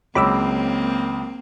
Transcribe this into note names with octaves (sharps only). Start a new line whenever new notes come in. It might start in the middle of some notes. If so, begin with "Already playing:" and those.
C#2 F#3 A#3 C4 B5 D6 E6